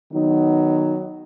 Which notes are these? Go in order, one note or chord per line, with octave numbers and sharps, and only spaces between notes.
D#3 F#3 B3 D#4